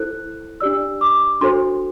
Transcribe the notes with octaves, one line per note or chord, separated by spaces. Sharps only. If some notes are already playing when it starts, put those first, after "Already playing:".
Already playing: E4 A4 C5 F#6
D4 G4 D5 E6
D6
D4 F#4 A4 C5 C6